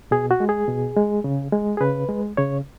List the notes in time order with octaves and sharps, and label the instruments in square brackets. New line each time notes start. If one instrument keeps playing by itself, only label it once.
[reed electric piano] B2 G#4
F#4
G#3
G#4
B2
G#3
C#3
G#3
G#4
C#3 B4
G#3
C#3 C#5